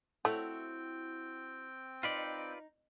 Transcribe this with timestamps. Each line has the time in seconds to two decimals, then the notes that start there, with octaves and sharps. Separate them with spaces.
0.25 A3 C4 E4 F#4 C#5 G5
2.03 D#4 F4 B4 D5